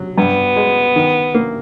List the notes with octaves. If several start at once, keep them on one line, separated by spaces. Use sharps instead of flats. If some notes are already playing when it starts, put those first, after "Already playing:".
Already playing: F#3
G2 B3
G#3
D#3
A#3